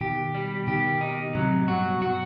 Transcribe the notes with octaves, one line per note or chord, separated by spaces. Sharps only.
B2 D#3 G4
G3
B2 D#3 G4
D#4
A2 C3 F#3
G2 B2 F#4
B2 F#4